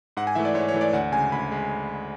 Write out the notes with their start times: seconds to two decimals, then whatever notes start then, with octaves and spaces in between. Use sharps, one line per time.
0.17 G#2 F#5
0.27 G#5
0.35 E3 A3 E5
0.45 D5
0.55 G#2 C#5
0.68 C#5
0.74 E3 A3
0.81 D5
0.93 D2 F#5
1.12 C#3 G#3 G#5
1.32 D2 B5
1.51 G#3